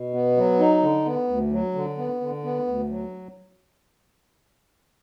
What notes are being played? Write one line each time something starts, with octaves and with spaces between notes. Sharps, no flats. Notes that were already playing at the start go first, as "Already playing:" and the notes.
Already playing: B2
B3
F#3
D#4
D3
B3
D2
F#3
D3
B3
D3
B3
D2
F#3